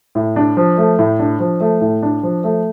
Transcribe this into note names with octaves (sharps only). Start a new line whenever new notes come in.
A2
D4
F3
A3
A2
D4
F3
A3
A2
D4
F3
A3